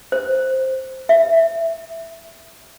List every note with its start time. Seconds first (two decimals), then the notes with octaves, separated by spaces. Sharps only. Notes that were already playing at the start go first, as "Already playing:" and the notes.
0.12 C5
1.09 E5